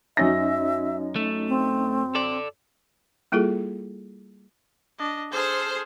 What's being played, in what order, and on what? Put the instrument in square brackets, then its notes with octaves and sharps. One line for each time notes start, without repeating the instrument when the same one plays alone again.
[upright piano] F#2 A#6 [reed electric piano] C#4 D#4 D#5 [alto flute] E5
[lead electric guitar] A3
[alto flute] C4
[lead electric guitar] A4 D5
[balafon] G3 A#3 E4 F4 G#4 A4
[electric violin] D4 D#5
[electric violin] G#4 F6 [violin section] A4 C5